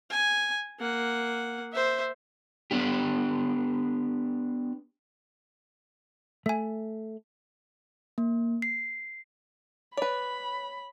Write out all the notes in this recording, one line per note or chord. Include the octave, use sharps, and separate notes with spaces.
G#5
A#3 F#5
C5 E5
B3 D4 G4
A3 E5 G#5
A#3
C7
B4 C#5 D5 B5